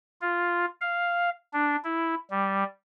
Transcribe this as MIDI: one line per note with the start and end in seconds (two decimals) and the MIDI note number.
0.21 0.65 65
0.81 1.30 77
1.53 1.76 62
1.84 2.15 64
2.31 2.64 55